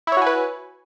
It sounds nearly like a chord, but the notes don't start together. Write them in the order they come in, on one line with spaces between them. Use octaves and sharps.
E4 C#5 F#4 G#5 B4